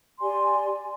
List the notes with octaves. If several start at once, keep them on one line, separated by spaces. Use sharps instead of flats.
G4 D5 G#5 C6